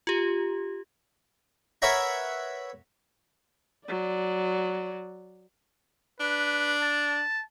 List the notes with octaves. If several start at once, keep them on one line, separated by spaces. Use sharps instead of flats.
F4 G4
A#4 B4 C#5 E5 F#5 A#5
F#3 D5
D4 B4
A5